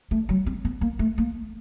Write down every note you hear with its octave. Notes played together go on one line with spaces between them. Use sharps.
A3
F#3
C4
B3
A#3
A3
A#3